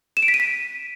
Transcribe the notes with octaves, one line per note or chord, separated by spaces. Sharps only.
E7
D7
B6
D#7
B6